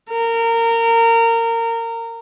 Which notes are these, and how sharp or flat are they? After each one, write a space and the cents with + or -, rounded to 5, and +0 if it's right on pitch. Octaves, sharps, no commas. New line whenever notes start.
A#4 -20